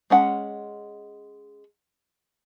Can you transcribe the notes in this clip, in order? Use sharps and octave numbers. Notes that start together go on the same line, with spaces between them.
G#3 C#4 F#5